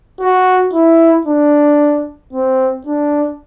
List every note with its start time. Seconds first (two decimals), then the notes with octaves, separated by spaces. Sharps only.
0.21 F#4
0.73 E4
1.27 D4
2.33 C4
2.86 D4